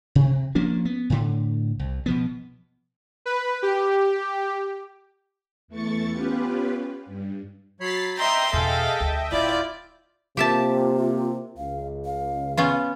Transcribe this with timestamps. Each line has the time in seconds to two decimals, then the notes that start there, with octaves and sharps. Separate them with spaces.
0.15 C3
0.55 F3 A#3 C#4 D4
0.85 B3
1.10 A2 D3
1.79 C2
2.06 B2 F3 B3
3.26 B4
3.63 G4
5.68 E2 E3 A3 C#6 A6 C#7
6.11 B3 C#4 F4 G4 B4
7.06 G2
7.80 F#3 C#5 B5 A6 B6 C7
8.17 D#5 E5 G5 A#5 C6 G6
8.53 E2 B2 G#4 A4 F5
9.00 D2
9.32 D1 D#3 E4 F4 D5 G6
10.37 C3 A#3 F4 G4 E5 A5
11.58 C#2 F5
12.05 F5
12.57 B3 C#4 F4